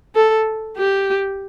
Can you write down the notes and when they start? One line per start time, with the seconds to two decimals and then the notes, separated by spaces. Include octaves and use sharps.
0.15 A4
0.77 G4